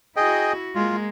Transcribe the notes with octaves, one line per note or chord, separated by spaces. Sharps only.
E4 F#4 G#4 D#5 G5
G#3 A#3 F4